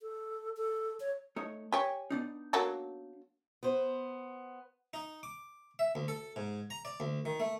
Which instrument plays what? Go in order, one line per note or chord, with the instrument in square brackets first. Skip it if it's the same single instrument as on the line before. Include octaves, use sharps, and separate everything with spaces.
[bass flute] A4
A4
C#5
[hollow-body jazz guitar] A3 D#4 C#5
[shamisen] G4 C#5 [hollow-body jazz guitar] G#5
[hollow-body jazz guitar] B3 D4 D#4
[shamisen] F#3 A#3 A4
[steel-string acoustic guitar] B3 C5
[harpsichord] D#4
D6
E5
D2
A4
G#2
A#5
D5
D2
D#3
A3